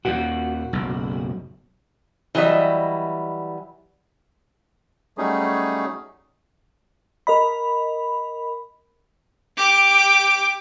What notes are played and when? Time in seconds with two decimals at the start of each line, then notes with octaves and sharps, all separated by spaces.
0.05 D#2 A#2 F#4
0.73 F#1 B1
2.35 E3 F#3 G3 D#5 E5
5.18 F#3 G3 A3 C#4 D#4 G#4
7.27 A#4 D#5 B5
9.57 G4 D6